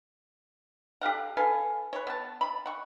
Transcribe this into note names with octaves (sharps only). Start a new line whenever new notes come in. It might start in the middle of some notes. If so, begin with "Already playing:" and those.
G4 A4 F5 F#5
A4 B4 F5 G#5
B4 C#5
B3 A5
B5
F#5 C#6